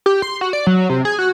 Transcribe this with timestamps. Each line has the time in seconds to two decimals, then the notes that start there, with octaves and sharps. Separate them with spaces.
0.06 G4
0.22 C6
0.41 F#4
0.53 D5
0.67 F#3
0.90 C3
1.05 G#4
1.19 F#4